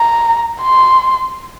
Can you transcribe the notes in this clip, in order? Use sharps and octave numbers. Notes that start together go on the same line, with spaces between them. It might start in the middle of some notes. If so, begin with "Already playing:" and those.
Already playing: A#5
C6